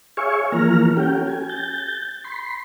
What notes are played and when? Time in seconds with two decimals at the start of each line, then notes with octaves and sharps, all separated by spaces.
0.17 G#4 C#5 E5 F5 G#5 C#6
0.52 E3 F3 A#3 A#5 F6
0.97 C#4 F#4 G4 A4 G5
1.27 G#5
1.49 G6 A6
2.24 B5 C6